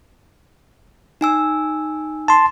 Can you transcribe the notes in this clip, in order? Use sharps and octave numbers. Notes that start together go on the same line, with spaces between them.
D#4 G#5 E6
A5 C6